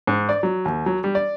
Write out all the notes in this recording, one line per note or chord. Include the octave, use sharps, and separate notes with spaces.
G#2
D5
F#3
D#2
F#3
G3
D5